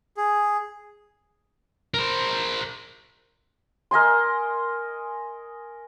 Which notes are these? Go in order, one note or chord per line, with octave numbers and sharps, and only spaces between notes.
G#4
A#4 C5
A#4 D#5 G#5 C6